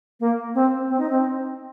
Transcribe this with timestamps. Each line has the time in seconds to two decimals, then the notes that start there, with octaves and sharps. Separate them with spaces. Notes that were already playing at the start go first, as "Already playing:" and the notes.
0.20 A#3
0.55 C4
0.89 C4
0.99 D#4
1.09 C4